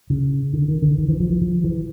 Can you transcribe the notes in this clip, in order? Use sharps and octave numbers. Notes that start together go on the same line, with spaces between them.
C#3
D3
D#3
D3
D#3
E3
F3
F3
F3
E3